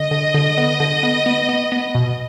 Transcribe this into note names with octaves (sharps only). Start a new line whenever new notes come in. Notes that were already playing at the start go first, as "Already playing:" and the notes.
Already playing: D3 D#5
D3
D3
B3
D3
B3
B3
B3
B3
B2